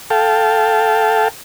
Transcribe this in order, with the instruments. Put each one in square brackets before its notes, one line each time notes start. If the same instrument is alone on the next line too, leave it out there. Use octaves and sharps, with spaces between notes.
[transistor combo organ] A4 F5 G5 A5